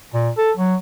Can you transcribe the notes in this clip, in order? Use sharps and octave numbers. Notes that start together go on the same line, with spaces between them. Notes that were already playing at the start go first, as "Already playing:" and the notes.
A#2
A4
F#3